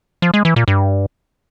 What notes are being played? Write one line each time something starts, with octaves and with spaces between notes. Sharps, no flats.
F3
G#3
E3
A#2
G2